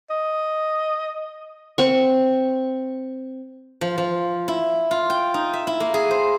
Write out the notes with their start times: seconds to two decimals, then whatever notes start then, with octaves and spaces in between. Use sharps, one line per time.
0.10 D#5
1.78 C4 C#6
3.81 F3
3.98 F3
4.48 E4
4.91 F4
5.10 G5
5.34 D#4
5.53 E5
5.67 E4
5.80 A#3
5.94 G#4
6.11 C5